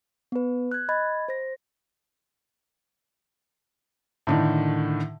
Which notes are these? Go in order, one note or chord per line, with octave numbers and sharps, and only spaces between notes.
B3 B4
F#6 G#6
D#5 B5 G#6 A6
C5 A#6
A2 D3 D#3